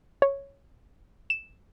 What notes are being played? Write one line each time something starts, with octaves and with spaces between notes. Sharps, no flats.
C#5
E7